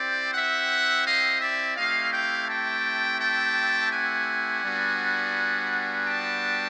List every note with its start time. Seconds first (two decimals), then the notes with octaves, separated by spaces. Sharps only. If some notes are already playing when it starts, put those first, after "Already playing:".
Already playing: C4 E4 G4 C5 D5
0.34 E5 F#5
1.05 D#5 F5
1.41 D5 E5
1.77 A3 C4 E4 G4 D#5 F5
2.13 F5 G5
2.48 G5 A5
3.20 G5 A5
3.91 F#5 G#5
4.63 G3 B3 D4 F#4
6.06 G5 A5